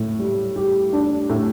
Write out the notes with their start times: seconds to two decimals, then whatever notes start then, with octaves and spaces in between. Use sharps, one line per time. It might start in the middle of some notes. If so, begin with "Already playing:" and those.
Already playing: A2
0.19 G3
0.56 G4
0.93 D4
1.30 A2